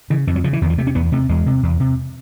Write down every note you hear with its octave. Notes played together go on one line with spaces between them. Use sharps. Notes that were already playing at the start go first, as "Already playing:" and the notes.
C#3 E3
F2 D#3
F#3
C#3 F3
E3
E2 D#3
F3
C3 A3
C#4
E2 B3
C3 A3
E2 G#3
C3
E2
C3